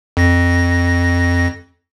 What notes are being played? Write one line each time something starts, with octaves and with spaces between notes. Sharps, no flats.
F2 A#6